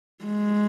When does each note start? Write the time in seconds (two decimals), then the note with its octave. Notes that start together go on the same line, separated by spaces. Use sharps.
0.25 G#3